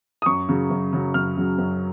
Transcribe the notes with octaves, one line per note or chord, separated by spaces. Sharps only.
D#6
F#2 C#6
C#3 F#3
F#2
C#3 F#3
F#2 F6
C#3 F#3
F#2